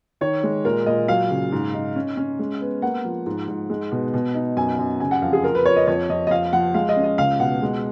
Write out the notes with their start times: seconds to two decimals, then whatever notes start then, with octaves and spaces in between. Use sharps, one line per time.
0.21 D#3 C#5
0.43 G#3
0.65 A#2 A#4
0.86 A#2 D#5
1.08 F#3 F5
1.30 C#3
1.52 G#2
1.74 D#4
1.96 C#4
2.17 C#4
2.39 G#3
2.61 B3
2.82 A#3 F#5
3.05 F3
3.26 G#2
3.48 G#2
3.70 G#3
3.92 B2
4.14 B2
4.35 D#4
4.57 F#2 G#5
4.79 F#2
5.00 C#3 G#5
5.11 F#5
5.22 F2 F5
5.33 G#4
5.44 F4 A#4
5.55 B4
5.65 F4 C#5
5.76 D#5
5.87 F2 C#5
6.09 F2 D#5
6.27 D#5
6.30 F3 F5
6.53 F3 F#5
6.74 G#3 F5
6.89 D#5
6.96 C#4
7.04 D#5
7.18 C#2 F5
7.39 B2 F#5
7.62 G#3